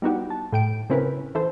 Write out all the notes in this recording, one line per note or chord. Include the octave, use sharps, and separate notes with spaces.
G3 B3 D#4 E4 F#4 G4
A5
A2 G5 D7
C#3 C4 C#4 E4 A#4 B4
E3 A4 C5